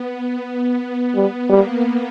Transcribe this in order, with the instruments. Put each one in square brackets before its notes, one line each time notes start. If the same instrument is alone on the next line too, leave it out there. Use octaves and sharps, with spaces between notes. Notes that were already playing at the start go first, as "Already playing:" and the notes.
Already playing: [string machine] B3
[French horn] G3 [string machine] B3
[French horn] G3 [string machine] A#3